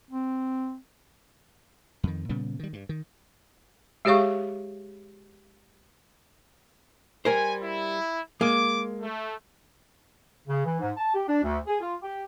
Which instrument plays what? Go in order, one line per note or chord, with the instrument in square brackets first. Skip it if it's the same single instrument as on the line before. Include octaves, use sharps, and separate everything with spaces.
[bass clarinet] C4
[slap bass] F2 D#3
A#2 C#3 G3 B3
D#3 G3
G2
D#3
[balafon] G#3 G4 G#4 C#5 F5 C#6
[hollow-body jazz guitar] G3 A#4 C5 [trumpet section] G#5
[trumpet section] E4
[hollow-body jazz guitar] G#3 A#3 [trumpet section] D6
[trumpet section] A3
[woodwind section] C#3
E3
G#2
A5
G4
D4
D2
G#4
F4
G4